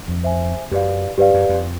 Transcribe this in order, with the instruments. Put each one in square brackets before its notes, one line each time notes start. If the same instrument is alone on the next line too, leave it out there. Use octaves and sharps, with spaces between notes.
[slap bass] F2
[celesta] C5 E5 G#5
[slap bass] F#2 [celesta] G4 B4 D5 F5
[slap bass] G2 [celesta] G4 B4 D5 F5
[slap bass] F#2
F2